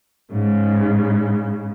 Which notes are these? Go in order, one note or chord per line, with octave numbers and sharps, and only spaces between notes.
G#2 C#3